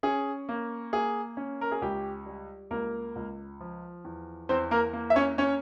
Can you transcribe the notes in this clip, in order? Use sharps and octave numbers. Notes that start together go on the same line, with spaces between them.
C#4 G#4
A#3
A#3 G#4
C#4
A#4
G#4
C#2 G4
G3
C#2 A#3 A#4
C#2
F3
E2
E2 C4 C5
A#3 A#4
A#3
E5
C#4 C#5
C#4 C#5